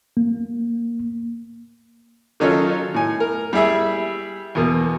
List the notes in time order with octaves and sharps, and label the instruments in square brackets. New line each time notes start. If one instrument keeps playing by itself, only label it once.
[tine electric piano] A#3
[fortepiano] D#3 F#3 C#4 D#4 F4 A4
A2 G#5
A#4
G3 E4 G#4 E5
E2 B2 A#3